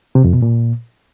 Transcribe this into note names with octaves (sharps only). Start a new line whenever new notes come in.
C3
F2
B2
A#2